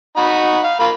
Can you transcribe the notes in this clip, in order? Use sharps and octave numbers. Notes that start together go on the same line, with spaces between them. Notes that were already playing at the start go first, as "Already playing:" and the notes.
D#4 F#4 B5
F5
A#3 F4 B5